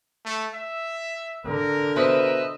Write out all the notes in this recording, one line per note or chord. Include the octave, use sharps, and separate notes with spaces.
A3
E5
D3 A#4
B2 B4 C5 D#5 E5